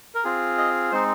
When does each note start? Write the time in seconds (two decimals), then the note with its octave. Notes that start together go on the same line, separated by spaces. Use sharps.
0.15 A#4
0.24 C4 F4 G#4
0.58 D#5
0.92 G#3 C4 D#4 C5